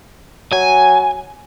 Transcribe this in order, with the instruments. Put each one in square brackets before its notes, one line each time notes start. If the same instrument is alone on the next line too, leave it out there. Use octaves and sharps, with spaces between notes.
[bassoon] F#3 [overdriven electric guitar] G#5